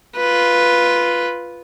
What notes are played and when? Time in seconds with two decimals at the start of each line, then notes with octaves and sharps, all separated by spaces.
0.16 F4 B4